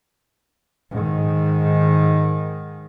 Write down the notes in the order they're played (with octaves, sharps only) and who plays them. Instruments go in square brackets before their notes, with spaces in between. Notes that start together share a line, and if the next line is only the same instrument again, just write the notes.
[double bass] G#2 D#3